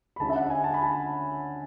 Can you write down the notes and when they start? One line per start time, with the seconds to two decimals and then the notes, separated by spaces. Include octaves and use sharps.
0.16 B5
0.20 D2 D3 G#3 C#4 A5
0.30 E5
0.35 F#5
0.50 G#5
0.64 A5
0.74 B5
0.83 A5